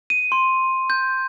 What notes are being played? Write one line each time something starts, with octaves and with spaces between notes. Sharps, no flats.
D#7
C6
G6